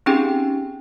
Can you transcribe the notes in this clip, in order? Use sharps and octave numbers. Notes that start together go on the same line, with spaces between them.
C4 C#4 D#4 G4 G#4 G5